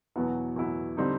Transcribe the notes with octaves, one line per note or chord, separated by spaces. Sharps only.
E2 B2 F#3 B3 E4
E2 B2 F#3 B3 E4
D3 G3 C4 D#4